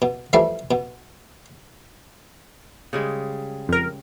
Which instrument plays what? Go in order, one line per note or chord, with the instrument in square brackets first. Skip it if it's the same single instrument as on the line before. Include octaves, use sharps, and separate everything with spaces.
[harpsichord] B2
E3 F3 G3 A3 D5
B2
[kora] C#3 G3 G#3
[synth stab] F2 A#4